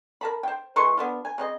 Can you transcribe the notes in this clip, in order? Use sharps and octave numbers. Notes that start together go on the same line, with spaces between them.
A#4 A5 B5
C5 G5
E3 G#3 C6 C#6
B3 D4 F4
G#5
C#3 C4 D#5